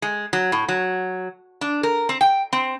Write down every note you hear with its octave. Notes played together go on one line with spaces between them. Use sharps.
G#3
F#3
A2
F#3
D4
A#4
C4
G5
C4